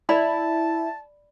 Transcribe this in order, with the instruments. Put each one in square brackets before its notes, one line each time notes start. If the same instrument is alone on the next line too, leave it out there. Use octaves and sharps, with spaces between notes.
[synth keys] E4 [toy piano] D5 B5 [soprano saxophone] A5